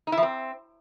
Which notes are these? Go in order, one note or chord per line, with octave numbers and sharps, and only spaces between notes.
D#4
E4
F3
C4